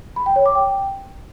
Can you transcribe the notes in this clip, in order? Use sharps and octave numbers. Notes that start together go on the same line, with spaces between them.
B5
G5
C#5
D6
G5